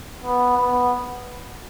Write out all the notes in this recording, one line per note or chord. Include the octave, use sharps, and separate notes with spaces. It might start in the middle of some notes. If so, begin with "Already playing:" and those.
B3
B3